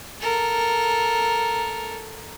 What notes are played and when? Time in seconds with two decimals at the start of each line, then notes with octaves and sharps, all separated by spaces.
0.21 A4 A#4